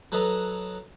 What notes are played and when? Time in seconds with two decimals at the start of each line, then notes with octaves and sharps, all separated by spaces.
0.12 F#3 A4 B4 D#5 A5 A#5